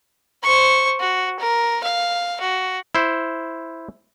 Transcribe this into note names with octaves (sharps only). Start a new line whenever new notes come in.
C5 C#6
F#4
A#4
F5
F#4
E4 C5